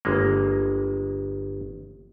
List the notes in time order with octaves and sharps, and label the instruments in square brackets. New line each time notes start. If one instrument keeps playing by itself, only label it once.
[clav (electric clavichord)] G1 G#3 A#3